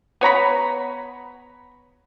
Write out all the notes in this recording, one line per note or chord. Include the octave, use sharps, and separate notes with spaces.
B3 C#5 A#5 B5